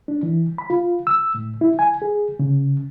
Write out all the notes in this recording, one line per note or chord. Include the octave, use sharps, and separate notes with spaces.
D4
E3
B5
F4
E6
A2
E4
G#5
G#4
C#3